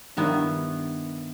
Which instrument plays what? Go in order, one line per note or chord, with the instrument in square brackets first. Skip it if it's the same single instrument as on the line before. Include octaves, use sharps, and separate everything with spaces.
[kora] G2 D#3 B3 E4